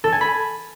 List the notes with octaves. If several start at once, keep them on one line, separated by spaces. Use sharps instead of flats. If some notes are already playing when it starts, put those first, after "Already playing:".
A4
G#5
B5